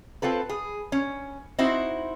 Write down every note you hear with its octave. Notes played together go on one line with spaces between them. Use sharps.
C4 F4 A4 B4
G#4
C#4
C4 D#4 E4 F#4 C5